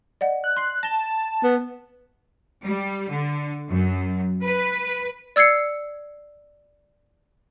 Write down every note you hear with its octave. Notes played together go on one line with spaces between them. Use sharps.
D5 D#5 F#5
F#6
C6 C7
A5 A#6 G7
B3
G3
D3
F#2
B4
D5 E6 G#6 C7 C#7